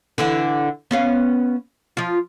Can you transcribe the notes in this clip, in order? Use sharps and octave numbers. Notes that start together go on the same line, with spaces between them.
D3 E3 E4
B3 C#4 F5
F3 F4